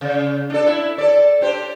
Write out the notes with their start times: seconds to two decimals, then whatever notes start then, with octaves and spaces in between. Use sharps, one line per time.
0.01 C#3
0.50 D4 A4
0.67 E4
0.98 A4 D5
1.41 D4 G4 C5